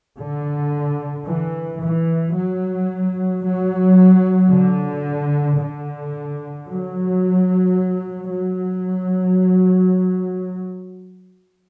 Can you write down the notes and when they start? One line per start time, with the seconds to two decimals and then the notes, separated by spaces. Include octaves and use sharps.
0.18 D3
1.26 E3
1.80 E3
2.35 F#3
3.44 F#3
4.51 D3
5.59 D3
6.68 F#3
8.30 F#3